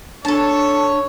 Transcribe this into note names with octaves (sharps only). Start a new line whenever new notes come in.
D4 A4 C#5 A5